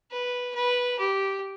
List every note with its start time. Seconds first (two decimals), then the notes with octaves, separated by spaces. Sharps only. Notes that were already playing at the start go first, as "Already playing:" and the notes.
0.11 B4
0.55 B4
0.99 G4